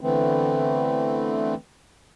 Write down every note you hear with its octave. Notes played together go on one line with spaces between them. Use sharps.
D3 E3 A3 B3 C4